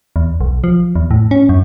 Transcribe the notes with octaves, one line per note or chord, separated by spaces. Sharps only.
E2
B1
F3
E2
A2
C#4
F#2